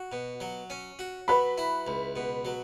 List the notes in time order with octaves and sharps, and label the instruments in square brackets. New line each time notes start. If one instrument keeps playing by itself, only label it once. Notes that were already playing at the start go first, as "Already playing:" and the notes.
Already playing: [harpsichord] F#4
B2
F#3
C#4
F#4
[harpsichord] F#3 [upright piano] B4 B5
[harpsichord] E4
C#2
B2
F#3